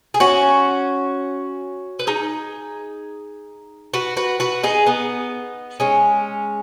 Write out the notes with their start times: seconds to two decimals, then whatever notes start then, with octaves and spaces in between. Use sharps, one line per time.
0.14 G#4
0.20 C#4 F#4
1.99 B4
2.07 D#4 G#4
3.94 F#4 B4
4.17 F#4 B4
4.40 F#4 B4
4.63 D#4 G#4
4.86 B3 D#4
5.80 G#3 C#4